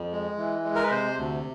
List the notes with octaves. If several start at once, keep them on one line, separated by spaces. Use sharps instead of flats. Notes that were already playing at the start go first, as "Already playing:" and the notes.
Already playing: F2
G#3
E3
G#3
A#4
B4
C3 C5
D2